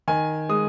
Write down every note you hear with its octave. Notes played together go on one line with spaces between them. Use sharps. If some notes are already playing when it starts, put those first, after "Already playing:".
D#3 G#5
G#3 D#6